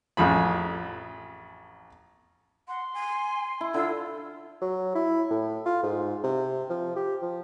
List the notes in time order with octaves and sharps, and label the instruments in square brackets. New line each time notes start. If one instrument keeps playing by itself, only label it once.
[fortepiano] A1 F2 G#4 B5
[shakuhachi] F#5 [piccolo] C6
[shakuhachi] G#5
[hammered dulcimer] E4
[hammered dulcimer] D3 [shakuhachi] F4 [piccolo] E6
[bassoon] F#3
E4
A2
F4
G#2
C3
F3
G4
F3